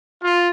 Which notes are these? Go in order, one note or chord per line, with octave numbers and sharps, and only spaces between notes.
F4